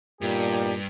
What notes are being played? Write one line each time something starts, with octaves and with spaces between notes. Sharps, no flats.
G2 A#2 B3 D#4 G4